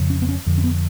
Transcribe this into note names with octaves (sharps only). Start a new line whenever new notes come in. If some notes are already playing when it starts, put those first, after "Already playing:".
Already playing: F2 C#3
C#4
B3
C#4
F2 D3
C#4
B3